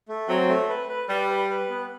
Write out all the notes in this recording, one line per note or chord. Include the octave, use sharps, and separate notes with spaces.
A3
F#3 C4
A3
B4
B4
G3 B4
B4
B4
B3